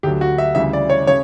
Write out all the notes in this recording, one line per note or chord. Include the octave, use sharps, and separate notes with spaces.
D2 D3 F#3 G4
F#4
E5
D2 C#3 E3 G3 E5
D5
C#5
C#3 C#5